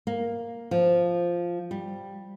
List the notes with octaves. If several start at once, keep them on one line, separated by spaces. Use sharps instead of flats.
A#3
F3
G3